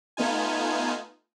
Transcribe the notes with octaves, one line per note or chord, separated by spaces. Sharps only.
A3 B3 D#4 F4 G#5